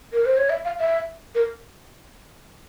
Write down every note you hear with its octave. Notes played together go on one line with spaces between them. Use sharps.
A#4
C5
C#5
E5
F5
E5
A#4